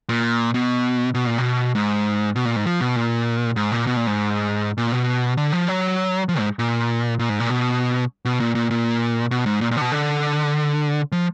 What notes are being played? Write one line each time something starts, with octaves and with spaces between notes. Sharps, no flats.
A#2
B2
B2
A#2
B2
G#2
B2
A#2
G#2
F3
B2
A#2
G#2
A#2
B2
A#2
G#2
A#2
B2
D3
F3
F#3
F3
G#2
A#2
A#2
G#2
A#2
B2
B2
A#2
A#2
A#2
B2
G#2
A#2
A#2
D3
B2
D3
F3